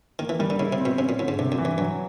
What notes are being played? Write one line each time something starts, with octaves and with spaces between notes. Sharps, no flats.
D#3 A#3
E3
D#3 G3
D3
C#3 E4
C3
C4
B2
C3 C#4
A#2
A2 D3
G#2
G2 C3
F#2
E3
G2
G2 F#3